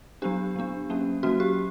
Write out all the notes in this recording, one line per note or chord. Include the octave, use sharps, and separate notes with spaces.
F#3 B3 D4 G4
F#3 B3 D4
F#3 A#3 C#4
F#3 A#3 C#4 F#4
G4